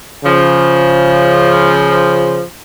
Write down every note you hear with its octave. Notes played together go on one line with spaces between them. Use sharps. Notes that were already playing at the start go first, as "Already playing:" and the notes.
C#3 F3